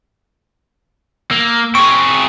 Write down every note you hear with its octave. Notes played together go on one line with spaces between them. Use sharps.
A#3 E6
C4 G#4 C#6